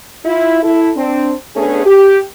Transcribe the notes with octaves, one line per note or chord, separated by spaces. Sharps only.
E4 F4
E4 A4
C4 D4
A3 B3 C#4 D4 G#4
G4